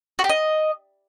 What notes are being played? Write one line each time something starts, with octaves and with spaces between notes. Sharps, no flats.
F#4
G4
D#5